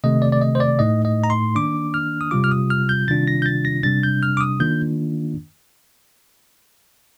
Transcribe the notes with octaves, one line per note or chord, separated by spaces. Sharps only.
C3 D#3 A3 D#5
D5
D5
D#5
C5
D5
A2 A3 D#4 D#5
D#5
A#5
C6
D#3 A#3 D4 D6
F6
D#6
C3 G3 C4 F4 D6
F6
D#6
F6
G6
C3 D#3 G3 D4 F4 A6
A#6
G6
A6
A#6
C3 G3 D4 A6
G6
F6
D6
D#6
D#3 A#3 D4 F4 G6